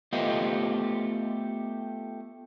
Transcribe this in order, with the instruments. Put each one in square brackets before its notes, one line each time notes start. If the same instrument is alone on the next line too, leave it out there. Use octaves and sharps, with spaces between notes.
[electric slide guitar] A3 B3 F4 G4 C5 D#5